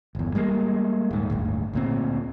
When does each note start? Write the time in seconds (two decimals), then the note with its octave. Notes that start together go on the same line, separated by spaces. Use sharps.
0.15 G1 E2
0.35 G3 G#3 A#3
1.11 D#1 G#2
1.30 D1 G1 D2
1.73 D2 A#2 C4